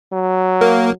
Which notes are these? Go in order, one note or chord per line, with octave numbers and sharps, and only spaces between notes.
F#3
A#3